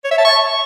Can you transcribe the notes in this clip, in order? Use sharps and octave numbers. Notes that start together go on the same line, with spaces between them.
C#5
E5
A5
C#6